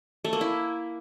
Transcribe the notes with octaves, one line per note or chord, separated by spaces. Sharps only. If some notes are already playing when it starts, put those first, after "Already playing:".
A3
A#3
E4